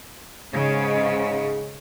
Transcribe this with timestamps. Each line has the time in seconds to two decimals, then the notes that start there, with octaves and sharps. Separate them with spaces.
0.54 G#2 C#3 G#3